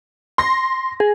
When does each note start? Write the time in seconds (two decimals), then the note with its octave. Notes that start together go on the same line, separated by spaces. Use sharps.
0.38 C6 A#6
1.00 G#4